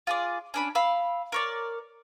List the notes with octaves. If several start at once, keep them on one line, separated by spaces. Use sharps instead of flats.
F4 G#4 D5
C#4 D4 B5
F5 B5 E6
A#4 C#5 D5